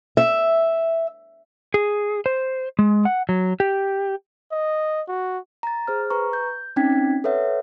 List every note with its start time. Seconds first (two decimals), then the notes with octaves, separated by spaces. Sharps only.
0.17 E5
1.74 G#4
2.26 C5
2.79 G#3
3.05 F#5
3.29 F#3
3.60 G4
4.51 D#5
5.08 F#4
5.63 A#5 A6
5.87 G#4 C5 F6
6.10 B4 A#5 C#6
6.33 G6
6.76 C4 C#4 D#4 G5 G#6 B6
7.24 A4 B4 C#5 E5 F#5